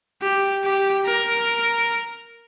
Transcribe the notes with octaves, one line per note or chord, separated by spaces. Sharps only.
G4
G4
A#4